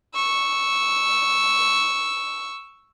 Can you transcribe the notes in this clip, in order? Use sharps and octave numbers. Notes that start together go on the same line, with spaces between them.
C#6 E6